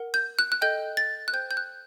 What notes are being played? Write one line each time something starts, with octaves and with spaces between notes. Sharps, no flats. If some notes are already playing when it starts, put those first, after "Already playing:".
Already playing: A#4 F#5
G6
F#6
F#6
A4 D#5 G5 G6
A6
F#6
C5 G5 G6
G6
F#6